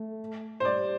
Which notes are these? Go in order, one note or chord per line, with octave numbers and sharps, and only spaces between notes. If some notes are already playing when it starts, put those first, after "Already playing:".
Already playing: A3
C5
G3 D5